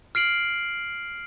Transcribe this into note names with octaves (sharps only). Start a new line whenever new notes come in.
F6 C7 D7 F#7